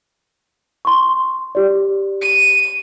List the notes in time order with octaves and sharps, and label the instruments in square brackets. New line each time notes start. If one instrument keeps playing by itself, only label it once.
[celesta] C6 C#6
G4 D5
[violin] D#7